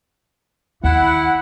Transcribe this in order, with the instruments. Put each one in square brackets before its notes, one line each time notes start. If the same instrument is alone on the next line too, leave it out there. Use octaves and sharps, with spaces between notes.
[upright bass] D#2 [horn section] E4 F#5